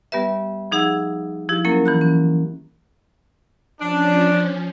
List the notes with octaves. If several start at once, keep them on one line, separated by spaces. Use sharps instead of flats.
G3 B3 G4 B4 E5
F3 D#4 G#4 F#5 E6 G#6
F3 E4 G4
F#3 A#3 C#4 A#4
E3 B5 F#6
C#4
F3 C#4 D4